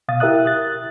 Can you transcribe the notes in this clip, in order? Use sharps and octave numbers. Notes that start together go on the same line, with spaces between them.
B2 F5 D#6 A6
E4 G4 A#4 E5 D#6 F#6
F#6 A6